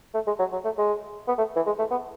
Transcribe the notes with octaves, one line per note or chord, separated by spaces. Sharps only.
A3
G#3
F#3
F#3
A3
G#3
B3
A3
E3
G#3
A3
B3